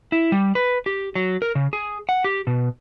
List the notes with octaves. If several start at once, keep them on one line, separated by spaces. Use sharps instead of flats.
E4
G3
B4
G4
F#3
A#4
C#3
G#4
F#5
G4
B2